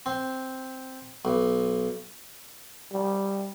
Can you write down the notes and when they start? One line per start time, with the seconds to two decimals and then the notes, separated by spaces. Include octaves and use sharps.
0.06 C4
1.25 B1
2.93 G3